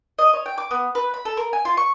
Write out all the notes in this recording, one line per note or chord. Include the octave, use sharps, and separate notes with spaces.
D#5
C#5
G5
D6
B3
B4
B5
A4
A#4
G#5
F4
C#6